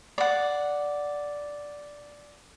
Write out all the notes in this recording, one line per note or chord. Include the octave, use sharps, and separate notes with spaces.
D5 F#5